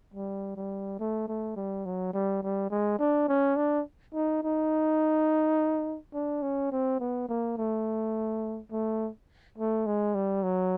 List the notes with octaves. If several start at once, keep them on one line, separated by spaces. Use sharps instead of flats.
G3
G3
A3
A3
G3
F#3
G3
G3
G#3
D4
C#4
D4
D#4
D#4
D4
C#4
C4
B3
A#3
A3
A3
A3
G#3
G3
F#3